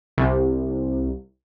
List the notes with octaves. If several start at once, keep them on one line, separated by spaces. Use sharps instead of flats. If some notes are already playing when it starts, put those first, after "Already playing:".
C2